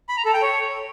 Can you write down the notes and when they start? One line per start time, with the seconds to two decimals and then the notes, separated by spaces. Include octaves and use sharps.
0.09 B5
0.17 A#5
0.25 A4
0.34 G5
0.42 C#5